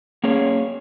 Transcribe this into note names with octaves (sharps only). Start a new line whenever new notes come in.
A#3 C#4 G#4 C#5